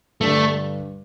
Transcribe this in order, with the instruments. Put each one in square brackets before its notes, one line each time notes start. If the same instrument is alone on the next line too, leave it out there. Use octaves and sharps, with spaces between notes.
[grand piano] G2 D3 G3 D4 [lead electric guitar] A3